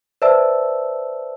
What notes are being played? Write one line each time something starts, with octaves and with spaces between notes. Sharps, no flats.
B4 C5 D5 E5 A5 E6